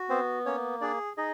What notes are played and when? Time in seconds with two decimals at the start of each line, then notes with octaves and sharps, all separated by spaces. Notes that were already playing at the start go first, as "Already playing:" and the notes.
Already playing: F#4
0.09 B3 C4 C5
0.45 A#3 C#4 C#5
0.81 D4 G#4 D5
1.17 D#4 G#4 D#5